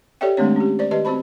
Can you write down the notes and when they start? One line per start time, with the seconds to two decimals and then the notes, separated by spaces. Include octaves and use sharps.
0.21 G4 A4 C#5 D5 E5 G5
0.37 D#3 G#3 A3 C4 D4 C#5
0.56 C#4 G4
0.79 C5 D5
0.91 D#3 G4 B4 D#5 A5
1.05 C4 F#4 C5 A5 B5